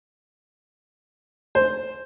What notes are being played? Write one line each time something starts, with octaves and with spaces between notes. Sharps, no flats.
C5